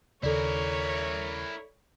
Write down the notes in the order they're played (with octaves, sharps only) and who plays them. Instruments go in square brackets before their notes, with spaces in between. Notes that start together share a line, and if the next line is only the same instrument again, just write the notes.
[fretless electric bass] D#2 C#3 [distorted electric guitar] E4 A#4 [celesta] A4 D5 [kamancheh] C#5